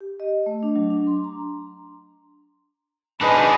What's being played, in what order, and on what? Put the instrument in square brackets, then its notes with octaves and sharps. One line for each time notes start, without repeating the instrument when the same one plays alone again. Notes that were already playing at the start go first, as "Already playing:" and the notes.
[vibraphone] G4
D#5
A3
D4
F#3
D4
C6
A#5
[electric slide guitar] D4 D#4 G#4 [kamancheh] B4 D#5